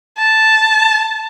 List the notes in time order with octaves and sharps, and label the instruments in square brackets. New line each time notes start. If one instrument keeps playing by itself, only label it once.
[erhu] A5